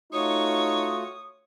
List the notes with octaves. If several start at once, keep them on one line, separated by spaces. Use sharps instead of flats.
A3 D#4 F4 F#4 C#5 C#6 D#6